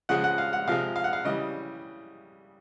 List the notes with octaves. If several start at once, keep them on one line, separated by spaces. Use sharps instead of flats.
C#3 F3 G#3 F#5
F#5
F5
F#5
C3 F3 G#3 F5
F5
F#5
F5
C#3 E3 G3 D#5